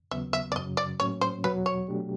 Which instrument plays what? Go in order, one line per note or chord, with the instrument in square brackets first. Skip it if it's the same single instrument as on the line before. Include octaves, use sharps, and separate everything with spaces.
[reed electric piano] D#2 C#3 F#3 B3 [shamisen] E5
[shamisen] E5
D5
[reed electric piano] F#2 C#3 F#3 [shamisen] D#5
[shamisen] D5
[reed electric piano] A2 F#3 A#3 C#4 [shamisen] C#5
[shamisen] C5
[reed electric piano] E2 B2 F#3 [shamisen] B4
[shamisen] C#5
[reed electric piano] B2 F#3 A3 D4 G4